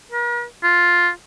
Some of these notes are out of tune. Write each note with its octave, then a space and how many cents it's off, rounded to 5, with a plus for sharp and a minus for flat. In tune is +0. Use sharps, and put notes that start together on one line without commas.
A#4 +45
F4 +5